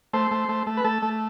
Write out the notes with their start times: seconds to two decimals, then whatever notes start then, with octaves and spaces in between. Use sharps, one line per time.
0.13 A3 C5
0.31 A3
0.49 A3
0.67 A3
0.77 B4
0.84 A3 A4
1.02 A3